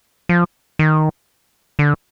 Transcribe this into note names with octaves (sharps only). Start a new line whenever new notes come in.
F3
D#3
D3